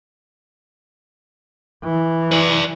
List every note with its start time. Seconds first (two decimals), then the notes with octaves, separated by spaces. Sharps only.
1.84 E3
2.32 B4 D5